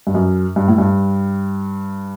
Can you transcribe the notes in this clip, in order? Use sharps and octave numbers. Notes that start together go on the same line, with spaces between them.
G2
F#2
G2
A2
G2